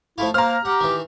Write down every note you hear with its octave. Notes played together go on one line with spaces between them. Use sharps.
F3 A3 E4 F4
A#3 C5 A5 A#5 F6
G4 F#5
D#3 E3